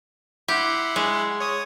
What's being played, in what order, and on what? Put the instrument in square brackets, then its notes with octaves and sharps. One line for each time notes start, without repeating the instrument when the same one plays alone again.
[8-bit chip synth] E4 F#5 C6 [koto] G4
[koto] G#3
[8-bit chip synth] C#5 D#6